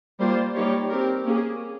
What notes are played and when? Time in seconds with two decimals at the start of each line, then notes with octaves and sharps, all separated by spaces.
0.19 G3 A#3 F4 C5
0.55 G3 A#3 D#4 G4 C#5
0.90 C4 G4 A#4
1.25 A#3 C#4 G#4